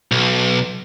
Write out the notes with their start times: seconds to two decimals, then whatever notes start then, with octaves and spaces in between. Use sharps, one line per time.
0.11 B1